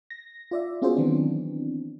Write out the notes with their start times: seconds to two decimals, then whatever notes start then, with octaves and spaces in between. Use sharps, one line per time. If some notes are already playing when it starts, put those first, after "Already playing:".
0.10 A#6
0.51 F4 D5 E5
0.82 B3 C#4 F4 F#4 G#4 C5
0.96 D#3 E3 F#3 B3 C4 D4